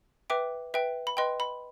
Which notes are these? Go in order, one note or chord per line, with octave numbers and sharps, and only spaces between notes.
B4 E5 G5 D6
B4 E5 G5
B5
B4 D#5 G5 C6
B5